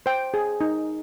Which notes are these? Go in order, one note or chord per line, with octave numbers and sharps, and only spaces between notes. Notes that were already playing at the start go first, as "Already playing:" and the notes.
C5 G5
G#4
D#4